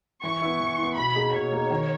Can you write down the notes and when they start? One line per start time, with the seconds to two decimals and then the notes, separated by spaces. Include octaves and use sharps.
0.23 E3 C#6
0.42 B3 E4
0.60 E3
0.78 E4
0.83 B3
0.96 B2 B5
1.15 A#3 D#4 G#4
1.33 B2 C#5
1.52 A#3 D#4 G#4
1.71 D#3